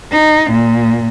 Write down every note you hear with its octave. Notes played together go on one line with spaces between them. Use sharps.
D#4
A#2